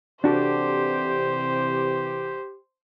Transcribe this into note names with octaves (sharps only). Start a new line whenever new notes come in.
C3 E3 D4 F#4 G4 A4 C5